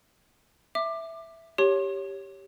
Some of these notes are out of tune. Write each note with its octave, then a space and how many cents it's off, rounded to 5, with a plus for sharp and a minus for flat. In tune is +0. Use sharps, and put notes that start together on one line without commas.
E5 +0 D6 +20
G4 +0 C#5 +0 C6 +35